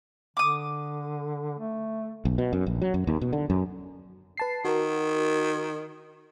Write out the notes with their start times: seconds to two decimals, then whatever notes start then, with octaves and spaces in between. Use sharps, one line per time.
0.37 D3 D6 D#6
1.59 A3
2.25 B1
2.38 B2
2.53 F#2
2.67 A#1
2.82 F#3
2.94 F#2
3.07 D#2
3.21 B2
3.33 D3
3.50 F#2
4.37 B4 A5 C7
4.65 D#3 F#4 A#4